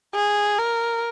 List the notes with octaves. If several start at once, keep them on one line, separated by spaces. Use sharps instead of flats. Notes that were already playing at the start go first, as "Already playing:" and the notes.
G#4
A#4